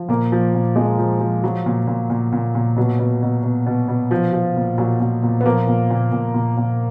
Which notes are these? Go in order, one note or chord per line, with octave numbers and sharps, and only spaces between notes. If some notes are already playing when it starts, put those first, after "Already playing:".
Already playing: F3
A#2 A#3
F3
A#2
F3 G#3
F3
F3
F3 F#3
A#2
A#2
A#2
A#2
A#2
B2 F#3
B2
B2
B2
B2
B2
F3
F3
A#2
A#2 F#3
A#2
A#2
B3
F3 A#3
A#2
A#2
A#2
A#2
A#2